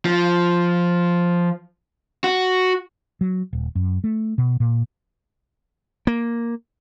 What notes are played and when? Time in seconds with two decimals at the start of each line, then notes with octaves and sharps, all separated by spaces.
0.05 F3
2.24 F#4
3.21 F#3
3.53 D#1
3.75 F#2
4.04 A3
4.38 B2
4.60 A#2
6.07 A#3